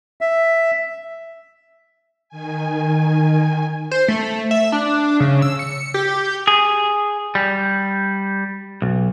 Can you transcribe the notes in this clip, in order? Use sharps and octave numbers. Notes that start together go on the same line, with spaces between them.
E5
D#3 G#5
C5
A3
E5
D4
C#3
E6
C#7
G4
G#4
G3
B1